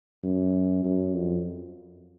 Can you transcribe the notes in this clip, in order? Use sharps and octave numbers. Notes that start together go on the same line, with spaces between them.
F#2
F#2
F2